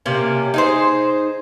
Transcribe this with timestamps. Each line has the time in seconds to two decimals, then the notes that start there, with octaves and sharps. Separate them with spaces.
0.06 C3 A#3 C#4
0.54 D#4 G#4 C5